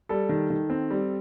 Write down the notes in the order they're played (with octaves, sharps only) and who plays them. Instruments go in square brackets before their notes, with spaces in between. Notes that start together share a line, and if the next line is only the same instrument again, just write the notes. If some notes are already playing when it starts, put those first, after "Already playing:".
[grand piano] G3 A4
D#3
D#3
C4
G3